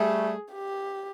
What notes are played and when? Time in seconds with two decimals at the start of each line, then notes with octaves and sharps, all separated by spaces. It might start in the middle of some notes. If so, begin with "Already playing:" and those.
Already playing: G3 A3 G#4
0.53 G4